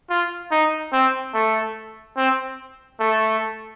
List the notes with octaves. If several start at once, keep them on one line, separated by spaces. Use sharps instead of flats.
F4
D#4
C4
A3
C4
A3